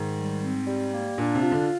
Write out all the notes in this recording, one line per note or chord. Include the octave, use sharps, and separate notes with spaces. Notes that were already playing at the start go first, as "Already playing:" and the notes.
Already playing: G#2 D#3
G3
C4
G3
A#3
A#2 D4
C3
F4
D3